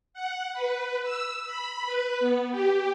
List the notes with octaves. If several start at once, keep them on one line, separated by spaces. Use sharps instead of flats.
F#5
B4
E6
B5
B4
B3
G4